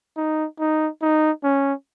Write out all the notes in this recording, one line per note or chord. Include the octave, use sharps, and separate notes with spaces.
D#4
D#4
D#4
C#4